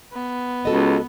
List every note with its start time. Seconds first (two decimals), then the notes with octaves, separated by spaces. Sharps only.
0.13 B3
0.65 C#2 F#4 A4 D#5